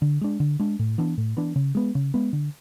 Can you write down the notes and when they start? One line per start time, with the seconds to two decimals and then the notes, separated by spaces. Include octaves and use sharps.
0.02 D3
0.21 G#3 D4
0.40 D3
0.60 G#3 D4
0.79 A2
0.98 E3 B3 D4
1.18 A2
1.37 E3 B3 D4
1.56 C#3
1.75 G#3 B3
1.95 C#3
2.14 G#3 B3
2.33 D3